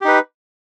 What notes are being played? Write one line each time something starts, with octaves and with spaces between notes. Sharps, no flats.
D#4 G4 B4